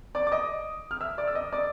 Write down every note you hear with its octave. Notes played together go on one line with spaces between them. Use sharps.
D5 D6
D6
D#5 D#6
F6
E5 E6
D5 D6
E6
D#5 D#6
D5 D6